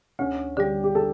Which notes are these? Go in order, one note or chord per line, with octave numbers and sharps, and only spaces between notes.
D2 C#4
D3 G3 G4
G4
A4